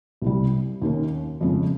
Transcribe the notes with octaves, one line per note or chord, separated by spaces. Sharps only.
C2 C3 G3
D#2 D#3 A#3 C#4
F2 C#3 G#3